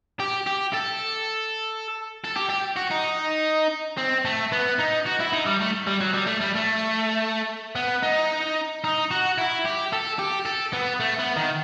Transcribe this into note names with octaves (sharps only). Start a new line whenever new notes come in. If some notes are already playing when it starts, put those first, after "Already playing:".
G4
G4
A4
A4
G4
G4
F#4
D#4
C4
A3
B3
D#4
F#4
E4
D#4
G3
A3
G3
F#3
G3
A3
G3
A3
B3
D#4
D#4
F#4
E4
G4
A4
G4
A4
B3
A3
B3
D#3